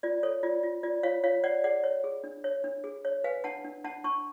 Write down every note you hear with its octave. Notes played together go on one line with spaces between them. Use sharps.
F4 D5
A4 C#5
F4 D5
F4
F4 D5
F4 C#5 F5
F4 C#5 F5
C#5 D5 F#5
G#4 D5 F#5
C#5
G#4
D4
C#5
D4
G#4
C#5
B4 F5 G#5
D4 F#5 A5
D4
D4 F#5 A5
D4 A5 C#6